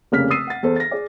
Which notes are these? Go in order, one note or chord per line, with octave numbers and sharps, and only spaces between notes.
F1 C#3 A#3 F6 B6
D#6 E6 A6 C7 D#7
F#5 A6
E2 A4 C5
A6 A#6
G#4 D5